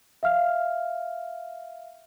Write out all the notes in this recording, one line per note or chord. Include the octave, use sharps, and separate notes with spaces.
E5 F5 F6